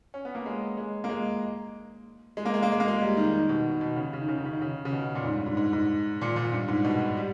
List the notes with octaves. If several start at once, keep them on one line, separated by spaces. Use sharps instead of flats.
C#4
B3
A#3
G#3
G#3
A#3
G#3
G#3
A#3
G#3
A#3
G#3
A#3
G#3
G3
D#3
D#3
B2
B2
C#3
C#3
D#3
C#3
D#3
C#3
D#3
C#3
C#3
B2
A#2
G#2
G2
G#2
G#2
G#2
A#2
A#2
G2
G#2
B2
G3